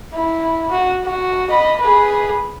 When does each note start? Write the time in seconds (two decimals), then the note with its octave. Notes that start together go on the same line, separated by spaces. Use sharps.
0.13 E4
0.71 F#4
1.04 F#4
1.50 D#5 B5
1.80 G#4 B4